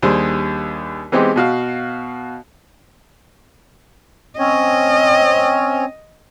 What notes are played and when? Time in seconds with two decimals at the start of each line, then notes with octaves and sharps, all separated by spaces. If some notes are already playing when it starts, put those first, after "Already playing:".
0.02 D#2 G3 D4 G#4 C5
1.12 E3 G#3 B3 C4 D#4 G4
1.36 B2 F#4 F5
4.39 C4 C#4 C#5 D#5